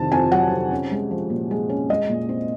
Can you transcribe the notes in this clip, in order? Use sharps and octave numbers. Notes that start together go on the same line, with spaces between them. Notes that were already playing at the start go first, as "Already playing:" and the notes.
Already playing: F2 C3 D#3 A5
F2 G#5
F#3 F#5
C3
C#4
G#3
F3
A#2
G#3
C#4
G#3 D#5
A#2
C4